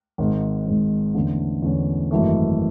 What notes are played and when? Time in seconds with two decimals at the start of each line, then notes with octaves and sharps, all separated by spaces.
0.18 G#1 G#2 G#3
0.66 G#1 G#2 G#3
1.14 E2 D3 A3 C#4
1.62 E2 D3 A3 C#4
2.11 G#1 F#2 E3 A3